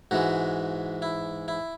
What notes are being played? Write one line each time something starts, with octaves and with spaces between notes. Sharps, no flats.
G#2 E3 G#3 F#4
E4
E4